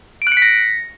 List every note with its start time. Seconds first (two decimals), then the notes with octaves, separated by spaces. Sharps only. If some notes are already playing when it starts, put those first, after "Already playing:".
0.22 D7
0.27 F#6
0.32 C#7
0.37 B6
0.42 A#6